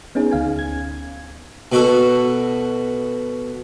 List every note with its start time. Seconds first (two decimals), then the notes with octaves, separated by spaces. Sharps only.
0.15 B3 C#4 D#4 G#4
0.31 D2 F5 G#5
0.59 G#6
1.72 B2 F#4 A4